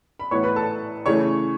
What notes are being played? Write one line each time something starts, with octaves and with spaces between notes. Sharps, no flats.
B5
A2 E3 B3 C#5 C#6
B4 B5
A4 A5
C#3 E3 A3 C#5 C#6